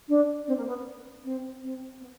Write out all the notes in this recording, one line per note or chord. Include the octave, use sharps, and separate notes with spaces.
D4
C4
A#3
B3
C4
C4
B3